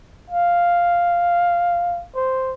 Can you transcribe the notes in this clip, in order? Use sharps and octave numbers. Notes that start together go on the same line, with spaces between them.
F5
C5